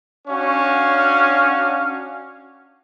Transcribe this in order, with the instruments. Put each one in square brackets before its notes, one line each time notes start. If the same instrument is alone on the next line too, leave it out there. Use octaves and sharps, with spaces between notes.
[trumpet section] C#4 D4 F#4 C#5 F5